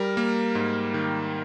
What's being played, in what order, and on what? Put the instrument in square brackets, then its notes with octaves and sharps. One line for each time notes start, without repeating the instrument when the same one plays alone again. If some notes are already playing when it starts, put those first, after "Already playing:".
Already playing: [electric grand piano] G3 A#4
A#3
G#2
D#3